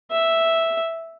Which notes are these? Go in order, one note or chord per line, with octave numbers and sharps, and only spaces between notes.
E5